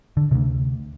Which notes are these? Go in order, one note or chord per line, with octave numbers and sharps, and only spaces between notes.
D3
D2 C3 D#3